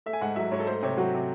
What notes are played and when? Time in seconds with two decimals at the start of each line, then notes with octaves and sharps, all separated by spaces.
0.06 A3 E5
0.13 G#5
0.21 G#2 F#5
0.36 F#3 E5
0.51 G#2 C#5
0.60 A4
0.67 A3 C5
0.83 C3 C#5
0.97 F#3 F#4
1.14 C3